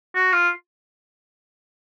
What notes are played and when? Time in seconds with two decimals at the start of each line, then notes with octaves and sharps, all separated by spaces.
0.15 F#4
0.33 F4